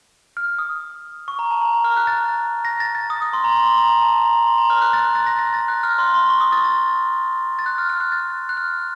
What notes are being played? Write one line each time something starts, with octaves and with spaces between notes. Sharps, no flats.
F6
D#6
C#6
A#5
A5
A#5
A#5
F6
F#6
A6
A#6
A6
A6
D#6
D#6
C6
A#5
C6
A#5
A5
A#5
C6
A#5
F6
F#6
A6
F#6
A6
A#6
A#6
A6
F#6
F6
C6
C6
C#6
D#6
A6
A6
A6
F#6
F6
F6
F#6
A6
F#6
F6